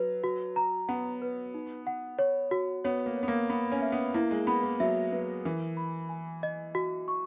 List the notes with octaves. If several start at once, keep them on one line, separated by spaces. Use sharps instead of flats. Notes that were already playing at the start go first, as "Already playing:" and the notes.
Already playing: F#3 B4
F#4
A#5
B3 F#5
B4
D#4
F#5
C#5
F#4
B3 C#5
A#3
C#5
B3
A#3
B3 B5
C#4
E5
B3
A#3 E4
G#3
B3 B5
A#3
F#3 E5
F#3 B4
E3 A#4
B5
G#5
D#5
F#4
C#6